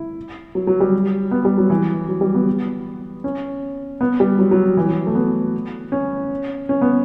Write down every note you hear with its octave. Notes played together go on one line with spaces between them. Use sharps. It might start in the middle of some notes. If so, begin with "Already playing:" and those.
Already playing: E4
F#3
F#3
G3
B3
G3
F#3
E3
F#3
G3
B3
C#4
B3
G3
F#3
F#3
E3
F#3
A3
B3
C#4
C#4
B3